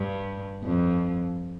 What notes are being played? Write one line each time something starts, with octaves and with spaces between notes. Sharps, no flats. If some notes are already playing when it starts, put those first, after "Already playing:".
Already playing: G2
F2